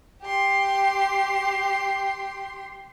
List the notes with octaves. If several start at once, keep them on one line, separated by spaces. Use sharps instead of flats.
G4 C6